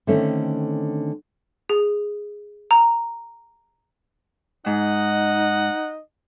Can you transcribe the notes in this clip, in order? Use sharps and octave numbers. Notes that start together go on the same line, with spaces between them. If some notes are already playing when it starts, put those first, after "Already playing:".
D3 D#3 A3 C4 C#4
G#4
A#5
G#2 D#4 D#5 F#5